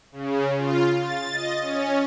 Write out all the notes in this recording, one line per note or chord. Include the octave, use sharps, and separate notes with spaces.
C#3
F4
A6
D#5
C#4